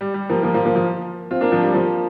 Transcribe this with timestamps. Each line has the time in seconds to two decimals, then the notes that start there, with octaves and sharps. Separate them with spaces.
0.01 G3
0.14 G3
0.30 F3 A#3
0.43 F3 A#3
0.54 F3 A#3
0.65 F3 A#3
0.76 F3
1.31 C4 F4
1.41 A#3 D4
1.52 F3
1.62 G3
1.74 F3 A#3